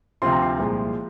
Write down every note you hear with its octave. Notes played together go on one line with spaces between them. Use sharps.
D2 C3 F3 C4 F4 C6
A#5
C6
C2 A#2 F3 G#3